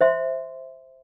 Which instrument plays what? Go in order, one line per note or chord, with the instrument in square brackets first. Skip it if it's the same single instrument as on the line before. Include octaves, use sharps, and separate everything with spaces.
[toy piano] C5 E5 C6